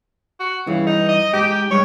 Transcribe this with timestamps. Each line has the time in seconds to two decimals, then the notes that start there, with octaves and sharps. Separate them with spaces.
0.40 F#4
0.67 G2 C#3 E3
0.87 D#4
1.08 D#5
1.33 G#2 G4
1.71 G2 G3 G#3 C#5